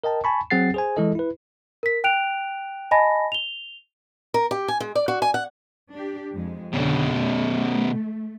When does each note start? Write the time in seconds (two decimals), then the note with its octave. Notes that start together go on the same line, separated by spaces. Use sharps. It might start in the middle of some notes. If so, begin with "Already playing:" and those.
0.04 A#4 D#5 G5 A5
0.24 G#5 A5 B5 C#6
0.50 F#3 C4 G#4 F#5 A6 C7
0.74 G#4 C5 G#5
0.97 E3 G#3 E4 A4 D#5
1.15 E4 B4
1.83 A#4 B6
2.04 G5 F#6 D7 F7
2.91 D#5 G#5 A5 B5 A#6
3.32 F7 G7
4.34 A#4
4.51 G4
4.68 G#5
4.80 G#3
4.95 D5
5.08 F#4
5.22 G#5
5.34 F#5
5.93 D4 G4
6.32 F2 G#3
6.73 F2 B2 D3 C#4
7.14 A3